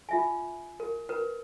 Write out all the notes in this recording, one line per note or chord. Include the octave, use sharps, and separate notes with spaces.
F4 E5 G#5
A#4
A#4 B4